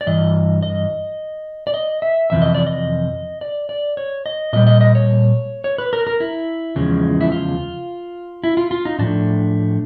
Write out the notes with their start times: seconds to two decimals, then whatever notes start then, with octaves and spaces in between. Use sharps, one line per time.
0.01 D5
0.07 G2 E3 D#5
0.62 D#5
1.67 D5
1.74 D#5
2.02 E5
2.30 F2 C3 E3 E5
2.42 D#5
2.55 D5
2.67 D#5
3.41 D5
3.69 D5
3.97 C#5
4.26 D#5
4.53 A#2 G3 D#5
4.67 D#5
4.81 D#5
4.95 C#5
5.64 C#5
5.78 B4
5.93 A#4
6.07 A#4
6.20 E4
6.76 E2 C#3 F3 G#3
7.21 E4
7.32 F4
8.44 E4
8.57 F4
8.71 F4
8.85 D#4
8.99 A2 F3 A3 D4